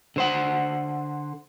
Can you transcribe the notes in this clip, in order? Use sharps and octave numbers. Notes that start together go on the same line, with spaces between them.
D3 C5 F#5